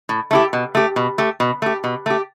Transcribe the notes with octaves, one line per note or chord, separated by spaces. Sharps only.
A2
A3 E4 G4
B2
A3 G4
B2
A3 G4
B2
A3 G4
B2
A3 G4